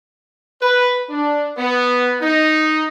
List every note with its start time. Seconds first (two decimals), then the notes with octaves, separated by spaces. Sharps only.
0.61 B4
1.09 D4
1.58 B3
2.21 D#4